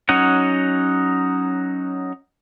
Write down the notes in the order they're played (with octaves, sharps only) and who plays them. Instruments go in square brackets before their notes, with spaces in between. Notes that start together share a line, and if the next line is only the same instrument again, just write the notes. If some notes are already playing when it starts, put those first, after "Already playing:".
[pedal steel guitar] F#3 C#4 D#4 F#5